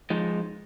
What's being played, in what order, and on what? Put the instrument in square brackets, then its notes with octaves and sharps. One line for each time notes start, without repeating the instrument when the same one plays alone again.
[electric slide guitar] F3 G#3 D#4